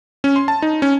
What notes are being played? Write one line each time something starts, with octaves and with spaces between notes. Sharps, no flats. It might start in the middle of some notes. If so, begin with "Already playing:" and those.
C#4
C6
A5
D#4
C#4